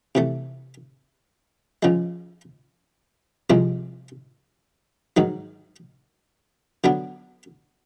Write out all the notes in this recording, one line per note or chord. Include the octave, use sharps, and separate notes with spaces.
C3 E3 A3
C#3 F3 G#3
C2 C3 F3 G#3 C4
G#2 D#3 F#3
D3 F#3 B3 D4